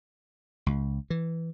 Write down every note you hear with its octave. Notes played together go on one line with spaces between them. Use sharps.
C#2
E3